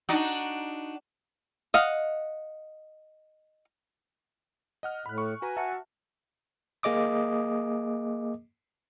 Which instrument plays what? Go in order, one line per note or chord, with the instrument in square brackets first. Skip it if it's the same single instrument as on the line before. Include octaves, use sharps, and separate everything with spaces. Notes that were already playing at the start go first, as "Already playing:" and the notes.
[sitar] D4 D#4 F#4
[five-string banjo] D#5 F5 F#5
[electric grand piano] D#5 F#5 F6
[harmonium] A2 [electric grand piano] B5 F#6
[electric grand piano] C#6
[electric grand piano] F#4 B4 A#5 [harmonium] G#5
[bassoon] F#4 [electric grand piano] E5 A5
[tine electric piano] A#3 G#4 D#5 D6 D#6